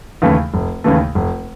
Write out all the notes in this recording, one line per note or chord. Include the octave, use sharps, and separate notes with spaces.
D#2 C#3 E3 A3
F1
D#2 C#3 E3 A3
F1